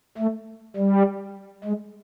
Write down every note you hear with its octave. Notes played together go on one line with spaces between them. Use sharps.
A3
G3
G#3